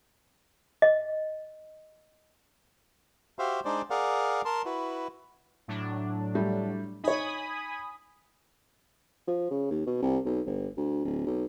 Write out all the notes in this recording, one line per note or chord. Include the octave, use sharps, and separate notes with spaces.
D#5
F#4 G4 C5 E5 F5
G#3 D4 D#4 C5 D5
G#4 A#4 D5 F5 F#5
A#4 A5 C6
E4 F#4 B4
A2 F#3 D4
G3 A3
D#4 C#5 G#5 B5 D#6
F3
C#3
D#2
B2
C2
B1
G1
D2
D1
B1